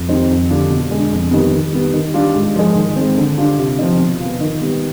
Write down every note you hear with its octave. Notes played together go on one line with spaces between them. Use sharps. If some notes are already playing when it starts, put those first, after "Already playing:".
Already playing: F2
D#3 G3 C4 D#4
F2
D3 G3 D4 F4
B2
G#3 D4
F2
D#3 G3 B3
D#3
G3 B3
D#3
G3 D4 F4
G#2
F3 G#3
D#3
G#3 C4
D3
G3 D4 F4
C3
F3 C4 D#4
B2
B3 F4
D#3
G3 B3